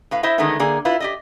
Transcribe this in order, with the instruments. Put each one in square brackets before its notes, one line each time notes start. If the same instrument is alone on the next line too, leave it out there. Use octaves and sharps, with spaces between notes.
[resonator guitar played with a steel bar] A2 B4 F5
E4 C5 D#5 E5
D3 D#3 G#3 A3 B3 D#4
D3 A#3 G#4 D5
E4 F4 B4
G4 D5 D#5